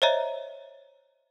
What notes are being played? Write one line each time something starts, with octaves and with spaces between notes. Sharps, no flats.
C5 C#5 D#5 E5 A#5